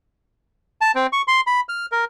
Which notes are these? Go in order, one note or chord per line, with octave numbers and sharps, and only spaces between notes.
A5
C4
C#6
C6
B5
F6
A#4